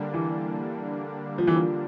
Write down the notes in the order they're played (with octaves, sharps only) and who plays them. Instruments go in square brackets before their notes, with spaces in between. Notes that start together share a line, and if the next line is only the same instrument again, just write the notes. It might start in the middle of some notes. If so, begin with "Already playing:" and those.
Already playing: [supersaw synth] D3 G3 A#3 D4
[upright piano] E3
F3
E3
F3